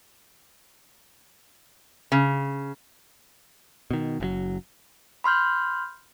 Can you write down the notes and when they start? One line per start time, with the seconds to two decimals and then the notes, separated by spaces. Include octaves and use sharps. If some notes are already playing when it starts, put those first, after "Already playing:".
2.12 C#3
3.91 B2 D#3
4.20 F#1 B2 F#3
5.24 B5 C6 F6 G6